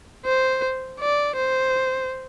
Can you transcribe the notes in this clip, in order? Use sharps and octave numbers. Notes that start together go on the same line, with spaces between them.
C5
D5
C5